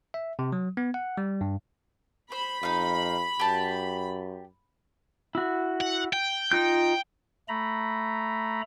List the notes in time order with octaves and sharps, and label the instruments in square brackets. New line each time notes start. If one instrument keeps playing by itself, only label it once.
[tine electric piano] E5
C3
F#3
B3
F#5
G3
G2
[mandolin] C5 [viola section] B5
[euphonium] F2 [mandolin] D#4 F5
[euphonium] F#2 [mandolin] G4 A5
[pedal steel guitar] E4 F#4
[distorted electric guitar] F#5
G5
[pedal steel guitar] D#4 F4 G6
[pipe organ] A3 A#5 B5